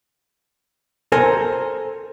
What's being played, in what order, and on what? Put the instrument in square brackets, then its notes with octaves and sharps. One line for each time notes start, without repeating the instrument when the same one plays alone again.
[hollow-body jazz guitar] A4 A#4 C5 G#5